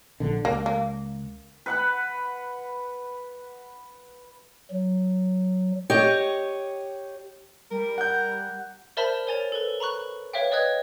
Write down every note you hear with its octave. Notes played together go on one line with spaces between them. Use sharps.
A#1 D3
C#2 A#3
A#3
B4 F#5 B5
F#3
G4 C#5 D#5
G3 A#4
F#5 G6
A#4 C5 D5 E5 A5 B5
A#4 C#5 G#5 A6 F7
A4 B4
A#5 B5 C#6 F#6
B4 C#5 E5 F5 G5
B4 D5 D#5 D#6 F#6 G#6